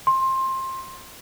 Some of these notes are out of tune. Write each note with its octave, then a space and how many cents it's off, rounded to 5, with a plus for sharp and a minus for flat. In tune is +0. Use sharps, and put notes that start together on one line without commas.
C6 +20